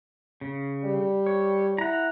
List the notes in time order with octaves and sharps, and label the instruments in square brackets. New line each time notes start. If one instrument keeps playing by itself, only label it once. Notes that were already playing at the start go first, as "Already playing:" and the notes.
[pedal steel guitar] C#3
[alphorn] G3
[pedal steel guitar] C#5
[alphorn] E4 [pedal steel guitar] F#5 A#5